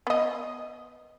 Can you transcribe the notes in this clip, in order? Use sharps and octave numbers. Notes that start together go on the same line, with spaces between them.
B3 D#5